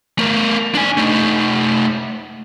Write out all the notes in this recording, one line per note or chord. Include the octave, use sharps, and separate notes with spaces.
A3 A#4
D4 G#5
A3 D#4